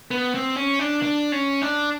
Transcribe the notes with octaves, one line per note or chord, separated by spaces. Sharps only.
B3
C4
C#4
D4
D4
C#4
D4